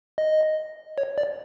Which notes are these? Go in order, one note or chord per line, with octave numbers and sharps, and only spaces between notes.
D#5
C#5
D5